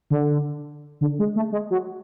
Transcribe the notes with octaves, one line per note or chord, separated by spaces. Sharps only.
D3
D3
G#3
A3
G#3
F#3